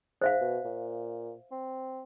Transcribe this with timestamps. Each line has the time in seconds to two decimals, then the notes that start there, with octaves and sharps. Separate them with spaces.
0.21 G#2 C5 E5 F5
0.41 B2
0.65 A#2
1.52 C4